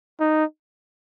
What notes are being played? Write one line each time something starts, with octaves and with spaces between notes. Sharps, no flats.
D#4